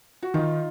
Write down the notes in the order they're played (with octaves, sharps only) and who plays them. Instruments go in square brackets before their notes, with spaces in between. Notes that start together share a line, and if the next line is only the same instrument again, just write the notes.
[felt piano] F#4
[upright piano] D#3 [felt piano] D#4 F4